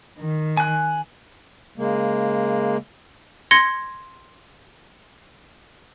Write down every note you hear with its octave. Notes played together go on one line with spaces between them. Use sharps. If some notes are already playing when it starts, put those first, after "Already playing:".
D#3
G#5 F#6
C#3 G#3 A#3
C6 G#6 A#6 C#7